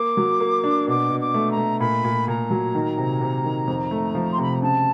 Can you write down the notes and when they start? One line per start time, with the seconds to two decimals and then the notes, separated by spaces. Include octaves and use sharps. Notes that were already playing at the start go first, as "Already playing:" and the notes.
Already playing: A#3 D6
0.17 F#3
0.40 A#3
0.64 D4
0.87 B2 D6
1.11 B2
1.19 D6
1.34 A3
1.50 A#5
1.57 A3
1.80 A#2 B5
2.04 A#2
2.27 A#2 A#5
2.50 F#3
2.75 D#3
2.98 C3
3.21 C3
3.44 D#3
3.67 F2
3.91 A3
4.15 F3
4.32 C6
4.38 C3 B5
4.51 A#5
4.62 C#3 A5